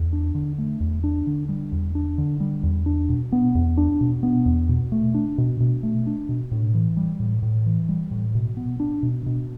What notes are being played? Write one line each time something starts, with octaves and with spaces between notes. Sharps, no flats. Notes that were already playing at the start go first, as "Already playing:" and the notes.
Already playing: E2
D4
D3
A3
E2
D4
D3
G3
E2
D4
D3
G3
E2
D4
B2
B3
E2
D4
B2
B3
E2
B2
A3
D4
B2
B2
A3
D4
B2
A2
E3
G3
A2
A2
E3
G3
A2
B2
B3
D4
B2
B2